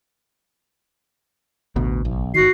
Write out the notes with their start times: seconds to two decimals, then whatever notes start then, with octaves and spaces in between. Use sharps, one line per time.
1.76 A1 D2 B2
2.05 B1
2.34 G1 D#3 F#4 C7